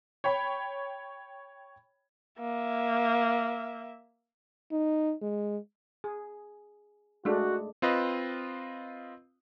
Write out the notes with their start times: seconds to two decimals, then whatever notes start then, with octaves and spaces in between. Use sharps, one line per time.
0.24 C#5 G5 B5
2.39 A#3 E5
4.72 D#4
5.22 G#3
6.04 G#4
7.25 G#3 A3 D4 F#4
7.82 C4 F4 B4 D#5